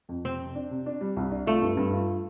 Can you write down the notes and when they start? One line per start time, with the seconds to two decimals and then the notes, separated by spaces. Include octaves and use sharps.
0.09 F2
0.25 C3 C4
0.40 C3
0.55 D4
0.71 C3
0.86 D4
1.01 G3
1.17 C2
1.31 D4
1.47 A3 F4
1.62 G2
1.77 G2
1.93 F4